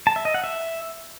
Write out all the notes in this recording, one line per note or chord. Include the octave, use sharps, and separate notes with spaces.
A5
E5
D#5
F#5
E5